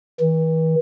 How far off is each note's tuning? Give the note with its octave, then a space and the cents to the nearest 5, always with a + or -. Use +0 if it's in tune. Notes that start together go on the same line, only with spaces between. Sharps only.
E3 -40